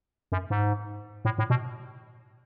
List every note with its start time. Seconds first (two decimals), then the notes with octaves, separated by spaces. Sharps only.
0.32 F#2
0.50 G#2
1.25 A2
1.38 A2
1.50 B2